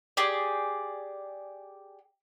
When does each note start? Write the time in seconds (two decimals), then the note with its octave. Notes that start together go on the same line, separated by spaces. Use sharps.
0.17 G4 G#4 D5